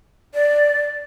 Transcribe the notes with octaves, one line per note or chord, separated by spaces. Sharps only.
D5